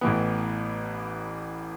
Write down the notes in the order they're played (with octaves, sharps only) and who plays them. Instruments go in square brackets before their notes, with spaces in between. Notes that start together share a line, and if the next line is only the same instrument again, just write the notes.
[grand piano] A1 A2 E3 B3